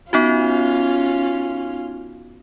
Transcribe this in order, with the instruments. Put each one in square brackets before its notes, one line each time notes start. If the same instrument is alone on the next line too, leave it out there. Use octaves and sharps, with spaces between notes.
[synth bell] B3 D#4 F#4 [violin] C#4 F4